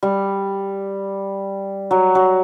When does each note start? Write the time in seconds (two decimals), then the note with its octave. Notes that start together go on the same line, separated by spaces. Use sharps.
0.03 G3
1.91 F#3
2.15 F#3